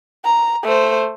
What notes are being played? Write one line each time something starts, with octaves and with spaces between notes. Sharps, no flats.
A#5
A3 C5